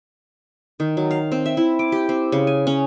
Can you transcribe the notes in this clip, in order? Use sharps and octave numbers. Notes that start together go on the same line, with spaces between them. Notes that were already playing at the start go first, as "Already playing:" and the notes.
D#3
F#3
F5
C4
E5
E4
D6
G4
C4
C#3
G#5
C#4